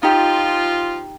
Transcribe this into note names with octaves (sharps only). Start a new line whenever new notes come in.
F3 D#4 F4 G4